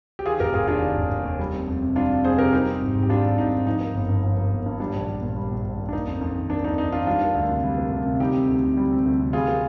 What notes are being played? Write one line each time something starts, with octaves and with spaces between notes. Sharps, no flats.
G4
D#3 F4 G#4
F1 G4 A#4
F1 F4 G#4
D#2 D4 F4
D#3
F1
F1
D#2
G3
C4
F2
C3
G3 D4 F4
C4
F2 G#4 C5
C3 G4 A#4
G3 D#4 G4
C4
G#1
G#2
G4
G3 D4 F4
C4
G#1 D#4
G#2
F3 D#4
A#3
G1
G2
F3
A#3
G1
G2
G3 D4
A#1
A#1
A#2
G3
A#1
A#1
A#2
D4
A#3 D#4
F2
F2
D#3
A#3 D4
F2 D#4
F2 D#4
D#3 D4 F4
G3 D4 F4
A#3
D2
C3
G3
A#3
D2
C3
G3 D#4 G4
C4
D2
C3
G3
C4
D2
C3
G3 F4 G#4
A#3